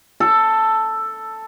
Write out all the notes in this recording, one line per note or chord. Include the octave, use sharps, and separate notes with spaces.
A4